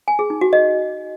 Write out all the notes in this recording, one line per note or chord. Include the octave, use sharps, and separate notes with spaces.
G#5
G#4
D#4
F#4
D#5